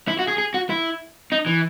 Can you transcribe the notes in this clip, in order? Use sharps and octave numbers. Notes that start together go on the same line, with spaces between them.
E4
F#4
G#4
G#4
F#4
E4
D#4
E3